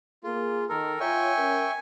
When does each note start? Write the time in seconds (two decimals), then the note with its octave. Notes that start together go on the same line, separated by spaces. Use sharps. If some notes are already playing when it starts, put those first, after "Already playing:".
0.24 A#3 F4 G#4
0.69 D#3 A4 A#4
1.00 F4 C#5 E5 G5 G#5 C#6
1.37 C#4 A#4